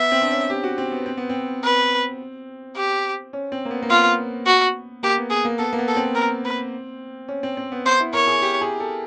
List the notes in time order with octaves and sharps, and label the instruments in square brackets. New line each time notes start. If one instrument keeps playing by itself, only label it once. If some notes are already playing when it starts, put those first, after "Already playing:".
Already playing: [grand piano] B3 [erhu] E5
[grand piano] C4
D4
C#4
G4
F#4
C4
B3
C4
B3
C4
[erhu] B4
G4
[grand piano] C#4
C4
A#3
B3
A#3
[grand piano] B3 [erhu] F4
[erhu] F#4
[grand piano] A#3 [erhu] G4
[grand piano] B3
[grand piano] B3 [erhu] G#4
[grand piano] A#3
[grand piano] B3 [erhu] A4
[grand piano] A#3
B3
[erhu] A4
[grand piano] C4
[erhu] A#4
B4
[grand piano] C#4
C4
C4
B3
[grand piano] B3 [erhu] C5
[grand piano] E4
[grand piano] A#4 [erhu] C#5
[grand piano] G#4
G4
G#4
A4